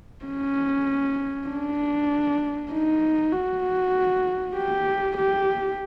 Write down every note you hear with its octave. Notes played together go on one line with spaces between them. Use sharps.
C#4
D4
D#4
F#4
G4
G4